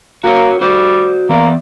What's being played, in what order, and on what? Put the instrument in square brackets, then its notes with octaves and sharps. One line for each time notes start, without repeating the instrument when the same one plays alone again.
[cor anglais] A#3 [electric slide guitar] F#4 A#4 C#5
[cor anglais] G3 [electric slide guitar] F#4 C5 D5
[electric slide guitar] E3 B3 D5 [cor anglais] A#3